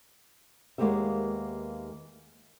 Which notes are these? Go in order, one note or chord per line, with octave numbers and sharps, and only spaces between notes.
D#2 G#3 A#3 B3 G4 E5